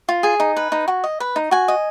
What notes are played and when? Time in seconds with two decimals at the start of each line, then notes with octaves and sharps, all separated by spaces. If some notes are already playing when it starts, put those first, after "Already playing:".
0.09 F4
0.23 G#4 G#5
0.40 D#4
0.56 B4
0.72 D#4
0.88 F#4
1.04 D#5
1.20 B4
1.36 D#4
1.51 F#4 G#5
1.68 D#5